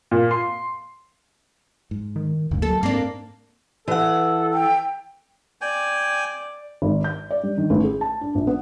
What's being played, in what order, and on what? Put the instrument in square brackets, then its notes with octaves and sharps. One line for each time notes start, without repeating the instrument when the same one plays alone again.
[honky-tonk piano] A#2
C6
[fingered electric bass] G#2
[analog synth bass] D#3
[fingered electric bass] F#1 G#2 C#3 [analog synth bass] D2
[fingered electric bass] F#3 A#3 [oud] A4
[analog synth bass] G#2 [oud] A#3 D4 [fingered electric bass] C4
[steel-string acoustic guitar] E3 F#5 [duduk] A4
[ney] G5
[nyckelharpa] D5 [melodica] G5 G#5
[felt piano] G#1
G6
D5
G3
D#3
A1
G#4
A5
D4
A#1
B3